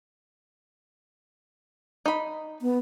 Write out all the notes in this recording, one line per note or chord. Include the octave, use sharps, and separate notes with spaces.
D#4 B5
B3